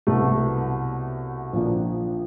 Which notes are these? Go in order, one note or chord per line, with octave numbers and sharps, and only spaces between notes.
C2 B2 F#3 A3
A#1 A#2 F3 A#3 D4